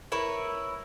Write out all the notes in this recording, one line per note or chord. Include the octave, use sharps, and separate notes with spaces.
E4 A#4 B4 C#5